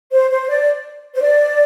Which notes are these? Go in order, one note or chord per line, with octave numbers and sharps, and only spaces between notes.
C5
C5
D5
C5
D5